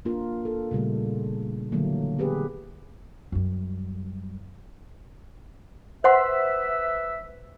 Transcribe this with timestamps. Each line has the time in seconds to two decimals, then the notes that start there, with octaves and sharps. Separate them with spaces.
0.05 A#3 D4 F4 A#4
0.45 A4
0.71 A#2 C#3 G3 A3
1.72 D3 E3 F#3 A3 A#3
2.19 B3 G4 G#4 B4
3.32 F#2 G3
6.04 B4 C5 E5 F#5 C6